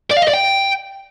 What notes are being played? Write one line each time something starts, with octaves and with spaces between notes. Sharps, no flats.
D5
F5
D#5
D5
G5